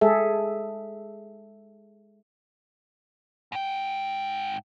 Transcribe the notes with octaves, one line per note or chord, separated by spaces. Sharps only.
G#3 G#4 A4 E5
G#2 G5